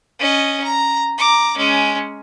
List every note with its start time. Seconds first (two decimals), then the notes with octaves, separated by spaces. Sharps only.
0.19 C#4 D#5
0.64 A#5
1.18 A#5 D6
1.57 G#3 C#4